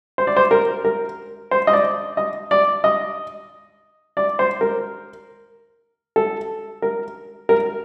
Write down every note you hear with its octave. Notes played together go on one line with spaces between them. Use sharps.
C5
D5
C5
A#4
A#4
C5
D#5
D5
D#5
D5
D#5
D5
C5
A#4
A4
A#4
A#4